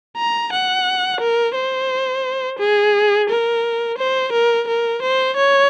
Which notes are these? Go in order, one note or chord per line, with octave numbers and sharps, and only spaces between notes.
A#5
F#5
A#4
C5
G#4
A#4
C5
A#4
A#4
C5
C#5